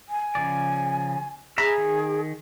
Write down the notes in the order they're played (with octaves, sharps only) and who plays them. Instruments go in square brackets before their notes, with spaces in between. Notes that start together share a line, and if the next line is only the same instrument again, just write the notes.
[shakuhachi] G#5
[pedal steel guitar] C#3 F3 D5
[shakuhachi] G#4 [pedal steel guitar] E5 A#5 B5
[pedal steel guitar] D#3